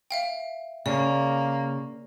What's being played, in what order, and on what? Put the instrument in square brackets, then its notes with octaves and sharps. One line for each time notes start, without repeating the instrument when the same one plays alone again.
[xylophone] E5 F5 G5
[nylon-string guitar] C#3 [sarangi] A#3 [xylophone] D5